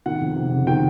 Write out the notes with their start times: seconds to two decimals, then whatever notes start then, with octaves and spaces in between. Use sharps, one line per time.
0.06 D#3 F#5
0.21 F2
0.36 C3
0.52 F#1
0.67 D#3 G5